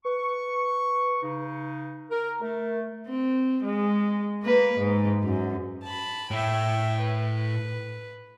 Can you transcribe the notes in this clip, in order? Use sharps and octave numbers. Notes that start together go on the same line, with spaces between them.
B4 C#6
C#3 D#4
A#4 A#5
A3 A#4
C4
G#3
A#3 B4
G#2
F#2
A5 B5
A2 E5 G5
B4